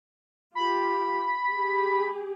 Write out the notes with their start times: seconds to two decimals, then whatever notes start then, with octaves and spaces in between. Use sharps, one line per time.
0.55 F4 G4 B5
1.50 G4 G#4